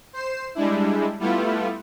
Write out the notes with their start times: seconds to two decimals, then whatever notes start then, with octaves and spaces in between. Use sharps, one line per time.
0.13 C5 C7 E7
0.55 G3 G#3 D4 E4
1.19 G3 A3 B3 E4 F4